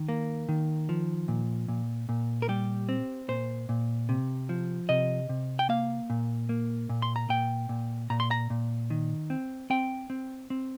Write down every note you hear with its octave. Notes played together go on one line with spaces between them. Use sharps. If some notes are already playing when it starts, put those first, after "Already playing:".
Already playing: D#3
A#3
D#3
F3
A#2
A#2
A#2
A#4
G3 G4
C4
A#2 C5
A#2
C3
F3
C3 D#5
C3
G5
A#3 F5
A#2
A#3
A#2
C6
A#5
A#2 G5
A#2
A#2 A#5
C6
A#5
A#2
D#3
C4
C4 G5
C4
C4